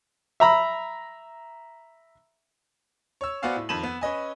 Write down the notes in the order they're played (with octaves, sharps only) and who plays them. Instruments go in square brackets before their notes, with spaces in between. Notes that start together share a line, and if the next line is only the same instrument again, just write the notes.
[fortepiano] E5 A#5 B5
[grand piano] C#5 E6
B3 F#4 C5 D5 F5 G#5
A2
F2 D#3 B5 D#7 E7 F#7
B3
C#4 B4 D#5 G#5